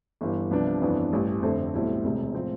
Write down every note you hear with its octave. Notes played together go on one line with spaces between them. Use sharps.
G1 G2 E3
C2 C3 F3 B3 D4
G1 F2 E3 B3 D4
A1 G2 E3
F1 F2 D3 A3 C4
B1 A2 G3 C4 E4
E1 D2 C3
A2 F3 C4